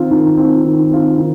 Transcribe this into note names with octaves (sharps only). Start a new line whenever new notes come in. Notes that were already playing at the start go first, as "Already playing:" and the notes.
Already playing: D#3 C4 F4
D#3
C4 F4
D#3
C4 F4
D#3